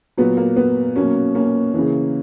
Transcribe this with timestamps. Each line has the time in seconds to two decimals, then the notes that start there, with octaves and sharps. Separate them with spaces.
0.17 A#2 F#3 B3
0.37 A#3
0.56 B3
0.96 B2 F#3 A#3 C#4
1.35 A#3 C#4
1.74 C#3 E3